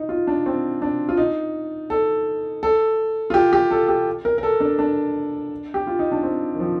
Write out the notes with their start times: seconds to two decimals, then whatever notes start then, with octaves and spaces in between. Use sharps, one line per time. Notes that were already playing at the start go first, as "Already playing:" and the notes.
Already playing: D#4
0.09 F4
0.27 D4
0.46 C4
0.82 D4
1.09 F4
1.17 D#4
1.90 A4
2.63 A4
3.30 F4
3.34 G4
3.53 G4
3.71 A4
3.88 G4
4.25 A#4
4.38 A#4
4.43 A4
4.60 D4
4.79 D4
5.74 G4
5.87 F4
5.99 D#4
6.12 D4
6.23 C4
6.55 D#3
6.60 F3